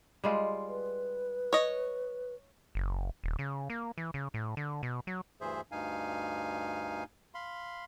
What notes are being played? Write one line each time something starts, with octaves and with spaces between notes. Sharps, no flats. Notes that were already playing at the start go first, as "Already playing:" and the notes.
G3 G#3 F4
B4
C#5 D#5
F#1
D#1
C#3
A#3
E3
C#3
A2
D3
B2
F#3
D2 G2 E3 G#4 C5 E5
D2 G2 D#4 F5 G#5
F5 B5 C6